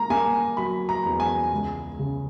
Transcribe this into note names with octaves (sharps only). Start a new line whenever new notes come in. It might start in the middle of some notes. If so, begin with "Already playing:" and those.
Already playing: A#3 A#5
A#3 G#5
F#3 B5
A#5
E2
G#5
C#2
C#3